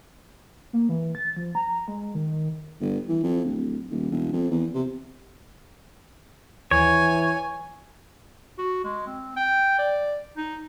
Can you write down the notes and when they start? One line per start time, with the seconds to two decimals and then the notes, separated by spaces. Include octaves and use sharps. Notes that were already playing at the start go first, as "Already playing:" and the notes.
0.73 A#3
0.89 E3
1.15 A6
1.36 F3
1.55 A#5
1.88 G#3
2.15 D#3
2.81 G1
3.09 E3
3.24 F2
3.45 D1
3.90 D#1
4.11 E1
4.33 F2
4.51 E2
4.74 C3
6.71 D#2 E3 C#5 G#5
8.58 F#4
8.84 G#3
9.07 C4
9.37 G5
9.79 D5
10.37 D#4